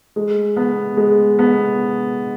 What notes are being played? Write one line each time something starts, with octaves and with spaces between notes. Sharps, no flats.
G#3
B3
G#3
B3